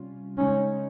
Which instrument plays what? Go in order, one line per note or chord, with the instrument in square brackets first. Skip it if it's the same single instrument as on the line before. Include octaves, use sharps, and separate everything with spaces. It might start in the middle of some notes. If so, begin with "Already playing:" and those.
Already playing: [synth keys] C3 G3 C#4 F4
[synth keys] C#3 G#3 D#4 [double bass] C#4